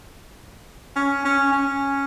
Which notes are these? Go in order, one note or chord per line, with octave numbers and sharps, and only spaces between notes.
C#4
C#4
C#4